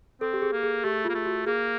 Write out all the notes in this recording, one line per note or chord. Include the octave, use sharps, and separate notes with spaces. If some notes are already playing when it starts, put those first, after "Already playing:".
C4 A4
G4
G#4
A#3
G#4
A3 G4
A#3 F4
A3
F#4
A#3 G#4